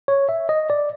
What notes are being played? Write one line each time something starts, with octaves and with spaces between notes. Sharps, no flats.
C#5
E5
D#5
D5